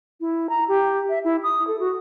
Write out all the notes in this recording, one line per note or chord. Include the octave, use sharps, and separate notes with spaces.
E4
A#5
G4
E5
E4
D#6
A4
F#4